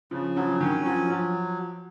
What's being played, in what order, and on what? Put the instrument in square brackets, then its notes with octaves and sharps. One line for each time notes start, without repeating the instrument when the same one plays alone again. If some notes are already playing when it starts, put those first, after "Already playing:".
[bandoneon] C#3 [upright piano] F3
[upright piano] F3 [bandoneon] F#3
[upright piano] D#3 [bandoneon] C#4
[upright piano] F3 [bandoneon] F#3
[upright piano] F3 [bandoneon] F#3